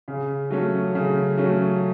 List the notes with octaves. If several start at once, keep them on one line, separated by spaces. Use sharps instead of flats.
C#3
F#3 A3 C#4
C#3
F#3 A3 C#4